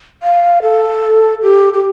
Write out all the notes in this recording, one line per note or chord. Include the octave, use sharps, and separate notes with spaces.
F5
A4
G4
G4